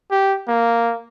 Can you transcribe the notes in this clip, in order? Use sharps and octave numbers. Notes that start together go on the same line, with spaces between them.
G4
A#3